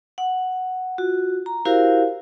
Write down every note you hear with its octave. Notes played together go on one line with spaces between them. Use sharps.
F#5
F4 F#4
A#5
E4 F#4 G4 A#4 C5 F5